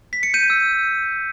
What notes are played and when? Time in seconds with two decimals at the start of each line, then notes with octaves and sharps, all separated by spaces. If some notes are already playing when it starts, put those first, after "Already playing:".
0.13 B6
0.23 C#7
0.34 G6 D#7
0.50 E6